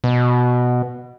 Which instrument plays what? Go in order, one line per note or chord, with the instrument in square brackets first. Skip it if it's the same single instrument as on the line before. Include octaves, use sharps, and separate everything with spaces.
[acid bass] B2